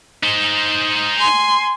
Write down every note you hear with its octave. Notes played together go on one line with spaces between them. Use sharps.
D#4 C5
G#5 C6